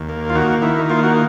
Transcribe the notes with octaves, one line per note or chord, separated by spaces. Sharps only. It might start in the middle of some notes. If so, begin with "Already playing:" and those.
Already playing: D#2
A#3
F4
D#3 F#4
D#3 E4
A#3 F4
F#4